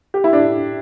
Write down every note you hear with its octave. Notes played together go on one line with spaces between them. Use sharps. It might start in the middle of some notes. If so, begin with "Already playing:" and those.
G4
E4
D4